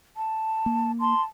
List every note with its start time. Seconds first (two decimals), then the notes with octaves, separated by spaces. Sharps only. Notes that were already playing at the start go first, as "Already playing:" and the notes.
0.17 A5
0.66 A#3
1.00 A5 C6